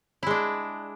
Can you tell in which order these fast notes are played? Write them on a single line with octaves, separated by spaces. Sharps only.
E4 G#3 D4